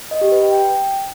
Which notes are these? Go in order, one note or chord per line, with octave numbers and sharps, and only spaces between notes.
D#5
G4
B4
G5
G5